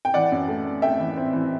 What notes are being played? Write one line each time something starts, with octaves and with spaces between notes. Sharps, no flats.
G5
E3 D5 F#5
F#2
A3
A3
A3 E5 G5
E3
C4
E3